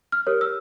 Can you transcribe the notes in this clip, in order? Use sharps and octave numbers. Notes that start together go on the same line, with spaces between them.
F6
G4 A#4 C#5
E6